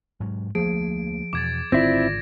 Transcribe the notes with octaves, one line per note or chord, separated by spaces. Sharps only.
G#2 F#3
D2 F3 A3 A#3 G#4 D7
E2 B2 D6 G#6 A6
G#1 D3 C4 E4 F4 D5 A#6